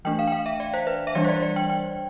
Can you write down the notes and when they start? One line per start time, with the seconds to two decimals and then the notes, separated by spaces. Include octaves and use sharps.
0.05 E3 A3 D4 G5
0.19 F5
0.27 G5
0.32 F5
0.46 E5
0.60 D5
0.74 C5
0.87 B4
1.07 E5
1.15 E3 G3 D4 D5
1.24 C5
1.28 D5
1.42 D5
1.56 G5
1.70 G5